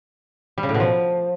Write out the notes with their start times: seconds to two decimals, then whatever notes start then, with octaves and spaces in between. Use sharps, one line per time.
0.58 G3
0.63 C#3
0.69 A2
0.74 B2
0.80 F3